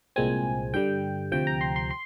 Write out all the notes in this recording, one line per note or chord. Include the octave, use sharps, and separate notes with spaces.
C2 A#2 G#3 C4 G#5
G2 D3 G3 G5
D2 C3 F3 G5
A#5
C6
C6
C6